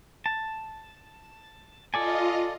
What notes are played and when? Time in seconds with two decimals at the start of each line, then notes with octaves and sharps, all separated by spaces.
0.26 A5
1.94 F4 A4 D5 D#5 G#5